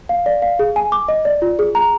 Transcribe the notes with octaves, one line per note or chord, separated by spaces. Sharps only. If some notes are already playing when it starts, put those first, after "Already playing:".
F5
D5
F5
G#4
G#5
D6
D#5
D5
F4
G#4
A#5